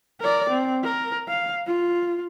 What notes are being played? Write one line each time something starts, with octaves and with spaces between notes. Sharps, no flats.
A#4 D5
C4
A#4
F5
F4